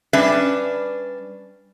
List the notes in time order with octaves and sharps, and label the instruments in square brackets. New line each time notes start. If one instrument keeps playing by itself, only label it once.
[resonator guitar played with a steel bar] G3 C#4 D4 B4 E5